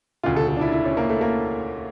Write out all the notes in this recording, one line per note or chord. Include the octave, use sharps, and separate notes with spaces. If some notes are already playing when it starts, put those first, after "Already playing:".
E1 D2 C#3 F4
A4
A4
D4
E4
E4
C#4
A#3
A3
A#3